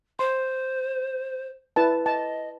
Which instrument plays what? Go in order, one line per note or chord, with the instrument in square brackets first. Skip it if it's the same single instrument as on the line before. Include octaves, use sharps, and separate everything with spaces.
[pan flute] C5 [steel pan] C6
[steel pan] E4 B4 A5
[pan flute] D#5 [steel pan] A5